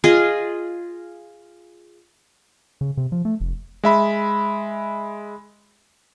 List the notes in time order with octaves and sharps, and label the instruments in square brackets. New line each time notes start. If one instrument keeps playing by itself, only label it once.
[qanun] F4 G#4 D#5
[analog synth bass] C#3
C3
F3
A3
F1
[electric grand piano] G#3 E5 B5